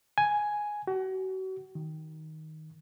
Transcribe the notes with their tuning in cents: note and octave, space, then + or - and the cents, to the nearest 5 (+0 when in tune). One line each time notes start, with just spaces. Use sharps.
G#5 +5
F#4 +35
D#3 +10